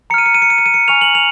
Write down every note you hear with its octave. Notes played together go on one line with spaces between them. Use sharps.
A#5 F6 C#7 D#7
C#7
D#7
C#7
D#7
C#7
D#7
C#7
G#5 C#6 F6 F7
F#7
F7